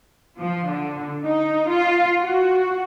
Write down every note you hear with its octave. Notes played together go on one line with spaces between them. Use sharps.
F3
D3
D#4
F4
F#4